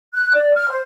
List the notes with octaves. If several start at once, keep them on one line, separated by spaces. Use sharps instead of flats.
F#6
D5
F6
C5